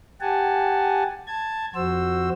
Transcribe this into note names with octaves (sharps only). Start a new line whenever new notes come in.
G4 F#5 G#5 A5
A5 G#6
F2 F#4 C5 E6